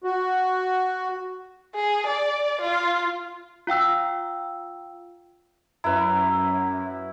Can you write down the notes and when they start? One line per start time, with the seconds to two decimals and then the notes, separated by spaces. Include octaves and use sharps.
0.04 F#4
1.75 G#4
2.07 D5
2.61 F4
3.67 F4 F5 G5 E6
5.84 F#2 E4 B4 A#5